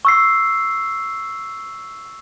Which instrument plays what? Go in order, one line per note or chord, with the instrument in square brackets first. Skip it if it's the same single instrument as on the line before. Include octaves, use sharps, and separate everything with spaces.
[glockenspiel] C#6 E6 C7